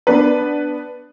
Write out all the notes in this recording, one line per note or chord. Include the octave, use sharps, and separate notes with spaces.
B3 D4 B4